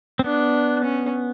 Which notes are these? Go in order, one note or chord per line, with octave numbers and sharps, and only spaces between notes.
C4
B3 D4
C#4